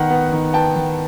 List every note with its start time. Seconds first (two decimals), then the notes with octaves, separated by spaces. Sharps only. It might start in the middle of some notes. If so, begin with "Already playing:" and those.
Already playing: D#3 B3 F#5
0.10 B3
0.33 D#3
0.54 B3 G5 A5
0.76 D#3